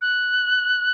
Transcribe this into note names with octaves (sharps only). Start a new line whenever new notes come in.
F#6